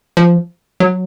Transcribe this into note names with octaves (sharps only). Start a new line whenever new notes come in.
F3
F#3